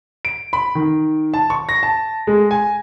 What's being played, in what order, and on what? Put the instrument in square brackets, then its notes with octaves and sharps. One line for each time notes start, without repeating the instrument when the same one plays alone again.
[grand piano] D7
B5
D#3
A5
C#6
A#6
A5
G#3
G#5